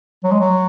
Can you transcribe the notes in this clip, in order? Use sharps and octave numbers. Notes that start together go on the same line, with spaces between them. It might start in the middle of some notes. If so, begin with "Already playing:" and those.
F#3
G#3
F#3